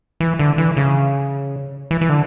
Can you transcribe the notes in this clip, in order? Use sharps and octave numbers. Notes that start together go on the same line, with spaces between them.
E3
D3
E3
C#3
E3
E3
D3